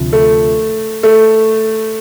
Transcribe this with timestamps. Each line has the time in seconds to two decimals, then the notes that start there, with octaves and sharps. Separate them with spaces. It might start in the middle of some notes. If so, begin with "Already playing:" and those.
Already playing: D2 C3 F3
0.13 A3
1.03 A3